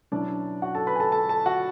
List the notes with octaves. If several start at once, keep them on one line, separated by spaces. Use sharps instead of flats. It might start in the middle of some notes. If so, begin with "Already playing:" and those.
B2 F#3 C#4 D4 E4 D5
F#4 F#5
A4 A5
B4 B5
G#5
A4 A5
A4 A5
A4 A5
F#4 F#5